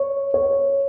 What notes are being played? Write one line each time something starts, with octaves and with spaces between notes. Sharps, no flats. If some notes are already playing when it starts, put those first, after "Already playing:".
Already playing: C#5
C#5